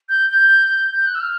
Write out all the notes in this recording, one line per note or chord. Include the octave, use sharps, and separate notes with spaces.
G6
G6
G6
F#6
E6
F6